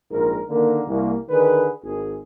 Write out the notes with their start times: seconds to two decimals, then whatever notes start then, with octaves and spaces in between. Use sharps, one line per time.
0.11 A#1 G#2 A#4
0.49 D3 D#3 A#3
0.87 C2 A#3
1.29 D3 D#3 G#4 B4
1.84 G#1 G#4